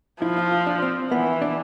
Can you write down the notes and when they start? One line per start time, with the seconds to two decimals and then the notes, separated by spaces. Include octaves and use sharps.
0.22 F3 E4
0.37 F4
0.52 F4
0.67 D4
0.82 C4
1.12 E3 B3
1.42 D4